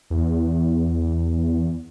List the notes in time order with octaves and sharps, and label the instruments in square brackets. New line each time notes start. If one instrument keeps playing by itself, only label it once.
[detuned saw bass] E2